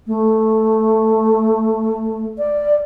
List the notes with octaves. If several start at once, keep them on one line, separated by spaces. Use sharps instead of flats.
A3
D5